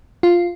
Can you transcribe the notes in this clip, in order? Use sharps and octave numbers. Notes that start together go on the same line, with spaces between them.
F4